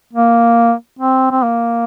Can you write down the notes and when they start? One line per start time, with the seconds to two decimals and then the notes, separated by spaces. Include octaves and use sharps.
0.13 A#3
0.99 C4
1.31 C4
1.43 A#3